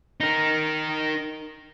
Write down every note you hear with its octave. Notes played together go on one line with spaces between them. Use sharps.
D#4 A#4